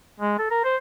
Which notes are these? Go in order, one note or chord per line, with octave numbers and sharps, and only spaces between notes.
G#3
A4
A#4
C5